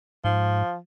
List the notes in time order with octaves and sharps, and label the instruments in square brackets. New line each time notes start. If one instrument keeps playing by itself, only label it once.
[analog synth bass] G#2 [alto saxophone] F3